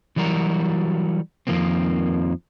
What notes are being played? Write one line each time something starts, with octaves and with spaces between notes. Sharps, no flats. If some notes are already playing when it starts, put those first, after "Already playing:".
E3 F#3 G3 F#4 A#4
F2 G#2 D#3 F3 A#3 C4